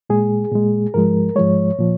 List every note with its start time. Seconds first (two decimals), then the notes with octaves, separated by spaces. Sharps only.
0.10 A#2 G#3 G#4
0.52 A#2 G#3
0.94 G#2 F3 G#3 A#4
1.36 G#2 F3 G#3 C#5
1.79 A#2 F3